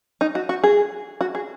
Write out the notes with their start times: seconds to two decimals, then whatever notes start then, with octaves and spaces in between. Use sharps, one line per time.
0.21 D#4
0.35 F#4
0.49 F#4
0.63 G#4
1.21 F#4
1.35 G#4